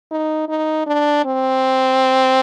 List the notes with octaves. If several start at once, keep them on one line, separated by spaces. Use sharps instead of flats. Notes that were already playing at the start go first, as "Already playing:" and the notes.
D#4
D#4
D4
C4